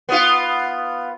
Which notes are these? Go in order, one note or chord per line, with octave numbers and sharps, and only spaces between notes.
B3 F4